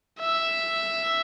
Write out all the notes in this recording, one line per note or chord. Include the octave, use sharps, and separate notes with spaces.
E5